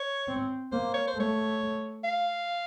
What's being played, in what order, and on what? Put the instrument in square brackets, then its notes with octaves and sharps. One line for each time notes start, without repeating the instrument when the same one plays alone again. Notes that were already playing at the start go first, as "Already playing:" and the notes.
Already playing: [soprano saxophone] C#5
[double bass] C4
[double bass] A#3 [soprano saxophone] C5
[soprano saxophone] C#5
C5
[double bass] A3 [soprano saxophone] C#5
[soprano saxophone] F5